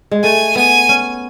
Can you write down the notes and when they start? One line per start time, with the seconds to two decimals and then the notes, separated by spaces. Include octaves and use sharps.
0.12 G#3
0.23 A3 G#5
0.56 B3 G#5
0.89 C#4